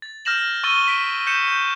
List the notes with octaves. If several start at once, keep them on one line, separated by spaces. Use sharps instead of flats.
A6
F6 G6 A#6 E7 F#7
C#6 E6 F6 A6 D#7 G7
B6 D7
G6 C#7 E7
G6